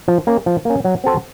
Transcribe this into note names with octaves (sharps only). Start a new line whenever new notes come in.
F3
A#3 C#4
F3
A#3 C#4
F#3
C4 F#4 A4 C5